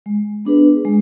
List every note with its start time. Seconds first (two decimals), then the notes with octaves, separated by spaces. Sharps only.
0.06 G#3
0.45 B3 D4 G#4 B4
0.85 G#3